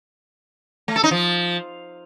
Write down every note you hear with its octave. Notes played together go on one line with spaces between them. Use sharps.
A3
A4
D#4
F3